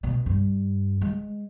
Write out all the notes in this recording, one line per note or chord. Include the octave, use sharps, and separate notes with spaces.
B2
G2
G#3